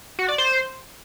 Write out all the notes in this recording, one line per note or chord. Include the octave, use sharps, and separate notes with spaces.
F#4
D5
C5